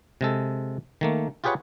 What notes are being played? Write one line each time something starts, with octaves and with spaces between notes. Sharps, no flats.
C3 G#3 A4
D#3 A3 A#3
F4 G4 G#4 B4 C#5 F#5